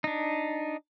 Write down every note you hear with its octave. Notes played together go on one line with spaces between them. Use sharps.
D4 D#4